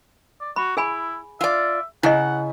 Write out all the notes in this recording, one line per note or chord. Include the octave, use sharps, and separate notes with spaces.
D5
F#4 B5
E4 G#4 G#5 B5
F4 D5 E5
C#3 E4 D#5 F#5